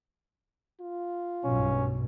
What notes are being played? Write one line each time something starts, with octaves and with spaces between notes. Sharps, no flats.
F4
B1 G2 B2 C#4